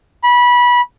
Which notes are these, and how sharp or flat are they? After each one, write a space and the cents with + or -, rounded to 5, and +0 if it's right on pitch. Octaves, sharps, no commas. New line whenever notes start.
B5 -20